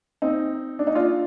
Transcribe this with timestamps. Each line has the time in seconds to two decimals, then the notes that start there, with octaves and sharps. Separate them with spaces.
0.22 C4 D#4
0.79 D4
0.87 D#4
0.95 D4 F4